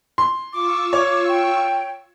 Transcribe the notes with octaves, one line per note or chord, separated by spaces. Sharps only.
C6
F4 C#6 D6 E6
C#5
G5